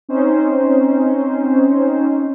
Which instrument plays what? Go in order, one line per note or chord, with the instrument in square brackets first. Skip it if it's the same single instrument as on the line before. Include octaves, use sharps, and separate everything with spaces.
[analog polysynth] C4 C#4 D#4 C5